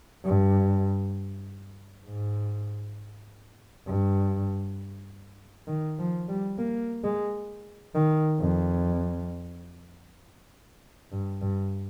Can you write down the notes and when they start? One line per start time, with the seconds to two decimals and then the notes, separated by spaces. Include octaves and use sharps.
0.24 G2
2.06 G#2
3.87 G2
5.68 D#3
5.98 F3
6.28 G3
6.58 A#3
7.04 G#3
7.95 D#3
8.40 F2
11.12 G2
11.42 G2